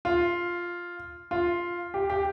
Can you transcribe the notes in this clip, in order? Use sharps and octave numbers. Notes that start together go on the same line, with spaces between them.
F4
F4
G4
G4